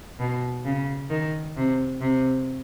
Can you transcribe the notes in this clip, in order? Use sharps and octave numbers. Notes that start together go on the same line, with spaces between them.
B2
C#3
D#3
C3
C3